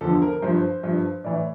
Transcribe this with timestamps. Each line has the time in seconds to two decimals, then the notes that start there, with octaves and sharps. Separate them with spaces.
0.01 E2 D3 F3 A4
0.22 A#4
0.42 G2 F3 C5
0.83 G2 F3
1.24 A2 E3 D5